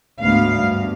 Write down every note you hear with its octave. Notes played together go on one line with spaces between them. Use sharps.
D2 G#2 B3 F5
G2